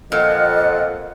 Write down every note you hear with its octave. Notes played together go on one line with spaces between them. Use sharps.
F2 A#2 A4 D#5 F#5